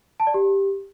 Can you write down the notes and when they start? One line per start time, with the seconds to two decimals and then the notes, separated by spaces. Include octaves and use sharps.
0.20 A5
0.27 D5
0.34 G4